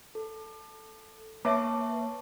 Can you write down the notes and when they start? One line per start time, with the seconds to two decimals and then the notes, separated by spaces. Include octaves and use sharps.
0.15 A4
1.45 A#3 B4 C#5 E5 A5 C#6 D6